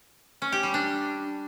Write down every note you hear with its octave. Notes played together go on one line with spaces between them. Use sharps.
C#4
G4
G3
D4